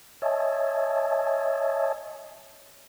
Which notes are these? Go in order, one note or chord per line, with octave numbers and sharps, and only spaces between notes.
C#5 D#5 E5 G#5 A5